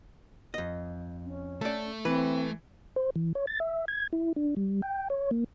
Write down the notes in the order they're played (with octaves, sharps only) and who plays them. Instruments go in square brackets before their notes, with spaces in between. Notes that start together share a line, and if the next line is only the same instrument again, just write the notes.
[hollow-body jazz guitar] F2 D#5
[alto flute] C#4
[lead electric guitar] A3 [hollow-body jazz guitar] A4 D5
[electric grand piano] E3 [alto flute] C4 [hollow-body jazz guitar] B4
[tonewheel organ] C5
E3
C#5
A6
E5
G#6
E4
D4
G3
G5
C#5
A#3